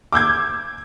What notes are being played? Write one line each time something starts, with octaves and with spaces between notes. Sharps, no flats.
D6 E6 G6 G#6